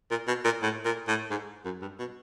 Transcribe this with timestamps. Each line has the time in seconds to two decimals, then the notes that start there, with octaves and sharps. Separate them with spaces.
0.11 A#2
0.27 B2
0.44 A#2
0.62 A2
0.85 A#2
1.08 A2
1.30 G#2
1.65 F#2
1.82 G2
1.99 B2